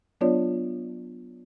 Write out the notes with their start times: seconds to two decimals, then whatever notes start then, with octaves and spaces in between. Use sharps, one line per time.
0.21 F#3 B3 D4 F4 C#5 D5